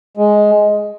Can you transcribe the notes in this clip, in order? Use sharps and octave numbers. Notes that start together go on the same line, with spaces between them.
G#3